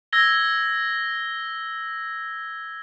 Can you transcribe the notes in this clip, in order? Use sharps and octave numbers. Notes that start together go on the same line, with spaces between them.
E6 G#6 A#6 G7